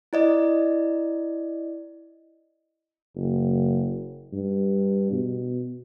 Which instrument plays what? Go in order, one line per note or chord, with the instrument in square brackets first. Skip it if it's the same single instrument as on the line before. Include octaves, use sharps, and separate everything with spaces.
[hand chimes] E4 D5 D#5
[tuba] F#1
G2
B2